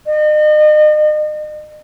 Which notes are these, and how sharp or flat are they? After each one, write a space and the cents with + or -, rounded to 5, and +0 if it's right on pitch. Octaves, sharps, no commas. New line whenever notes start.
D#5 -40